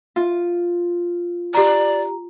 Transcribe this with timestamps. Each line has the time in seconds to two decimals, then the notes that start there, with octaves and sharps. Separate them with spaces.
0.16 F4
1.55 G4 D5 A#5